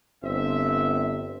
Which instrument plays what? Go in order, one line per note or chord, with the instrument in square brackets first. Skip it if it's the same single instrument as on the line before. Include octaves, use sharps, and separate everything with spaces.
[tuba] G1 [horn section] C4 E5